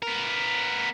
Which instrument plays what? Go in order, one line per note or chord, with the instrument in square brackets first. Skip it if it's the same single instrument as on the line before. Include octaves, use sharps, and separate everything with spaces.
[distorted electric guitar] B3 A#4